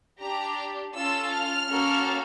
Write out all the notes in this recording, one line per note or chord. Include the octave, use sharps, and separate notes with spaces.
D4 G4 A#5
C#4 F4 A4 E6
F6
A#3 C#4 F#4 A4